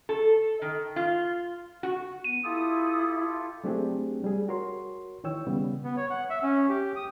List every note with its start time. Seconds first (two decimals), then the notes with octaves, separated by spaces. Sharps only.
0.09 A4
0.62 D#3
0.96 F4
1.83 F#4
2.24 B3 D#7
2.43 E4 F4 G4 A4 D#6
3.64 F#3 A3 C4 D4 G4 G#4
4.24 G3 G#4
4.48 F#4 A#4 C#5 C6
5.24 D#3 E3 C#5 G5 E6
5.47 C#3 G3 B3
5.84 B3
5.97 C#5
6.10 F#5
6.30 E5
6.43 C#4
6.69 G4
6.96 D#6